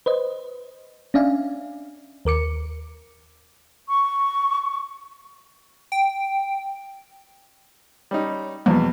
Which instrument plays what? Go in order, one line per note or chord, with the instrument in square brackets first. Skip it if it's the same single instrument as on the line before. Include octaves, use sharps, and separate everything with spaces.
[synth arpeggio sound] B4 C5 D#5
C#4 D4 D5 E5 F5 G#5
D#2 A#4 D6 C#7
[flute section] C#6
[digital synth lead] G5
[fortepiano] G3 C#4 D#4
[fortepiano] E2 B2 [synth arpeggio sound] F3 G3 A#3